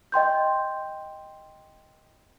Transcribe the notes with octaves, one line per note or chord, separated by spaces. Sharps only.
D#5 G5 C6 G6